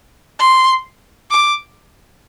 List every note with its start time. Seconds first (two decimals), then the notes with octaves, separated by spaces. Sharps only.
0.39 C6
1.31 D6